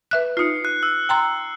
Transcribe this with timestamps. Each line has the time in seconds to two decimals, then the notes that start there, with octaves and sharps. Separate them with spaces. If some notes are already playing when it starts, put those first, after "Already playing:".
0.11 B4 E5 F#6
0.37 D#4 F4 C7 C#7
0.65 F#6
0.83 E6 F#6
1.09 G5 A#5 C6